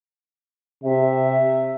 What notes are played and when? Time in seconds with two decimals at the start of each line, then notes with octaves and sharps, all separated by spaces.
0.84 C3 E5